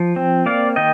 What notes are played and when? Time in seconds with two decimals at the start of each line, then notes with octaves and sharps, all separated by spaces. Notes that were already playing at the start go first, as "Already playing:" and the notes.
Already playing: F3
0.16 C4
0.46 A#3 D5 F5
0.76 D#3 D#5 G5